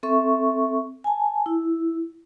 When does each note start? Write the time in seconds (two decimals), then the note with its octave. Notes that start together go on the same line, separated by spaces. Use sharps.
0.03 C4 A4 E5 C#6
1.04 G#5 A5
1.46 E4